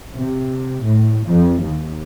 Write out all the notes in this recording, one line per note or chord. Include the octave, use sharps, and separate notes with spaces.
C3
A2
F2
D#2